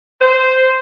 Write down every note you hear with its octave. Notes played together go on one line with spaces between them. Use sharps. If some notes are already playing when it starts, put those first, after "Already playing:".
C5